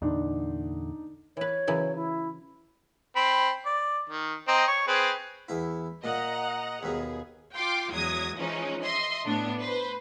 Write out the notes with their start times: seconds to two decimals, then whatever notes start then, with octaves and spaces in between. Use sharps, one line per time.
0.02 E2 A#2 D3 D4 D#4
1.37 E3 B4 C#5
1.67 C#3 E3 F#3
1.95 E4
3.16 C4 B5
3.66 D5
4.10 D#3
4.48 C4 D#5 A#5
4.68 C#5
4.88 C4 G#4 B4
5.49 E2 E4
6.04 A#2 D#5 F#5 A#5
6.83 D#2 B2 G#4
7.53 F4 G5 C6 D6
7.91 E2 F#3 G#3 D#6 G#6 A#6
8.37 E3 F3 G#3 C#4 D#4
8.83 D#5 E5 C6
9.25 A2 B3 D4
9.59 B4 C5